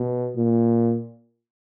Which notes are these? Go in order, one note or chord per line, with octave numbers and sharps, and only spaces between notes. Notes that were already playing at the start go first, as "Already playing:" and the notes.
Already playing: B2
A#2